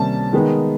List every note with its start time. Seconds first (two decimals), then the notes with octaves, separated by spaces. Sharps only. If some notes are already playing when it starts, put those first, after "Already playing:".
Already playing: C3 D#3 G3 A#3 C#4 A5
0.33 D#3 G#3 B3 D#4